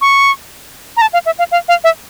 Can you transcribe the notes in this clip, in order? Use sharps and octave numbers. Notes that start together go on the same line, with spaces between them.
C#6
A#5
A5
F5
E5
F5
F5
F5
E5